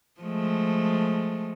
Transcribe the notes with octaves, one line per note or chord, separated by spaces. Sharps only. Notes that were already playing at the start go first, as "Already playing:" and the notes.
F3 G#3 A3